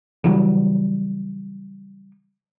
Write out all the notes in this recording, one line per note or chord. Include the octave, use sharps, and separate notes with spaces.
C#3 E3 F#3 G3